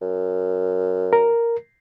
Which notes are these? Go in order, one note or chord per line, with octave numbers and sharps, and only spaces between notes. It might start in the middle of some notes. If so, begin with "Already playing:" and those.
F#2
A#4